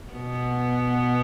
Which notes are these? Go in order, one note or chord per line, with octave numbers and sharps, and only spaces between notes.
B2 B3